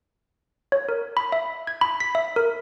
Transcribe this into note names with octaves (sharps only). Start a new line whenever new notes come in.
C#5
A#4
B5
E5
G#6
B5
B6
E5
A#4